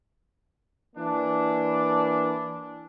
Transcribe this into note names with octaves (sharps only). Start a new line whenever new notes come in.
E3 A#3 D4